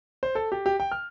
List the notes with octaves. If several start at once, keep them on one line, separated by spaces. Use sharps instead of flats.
C5
A4
G4
G4
G5
F6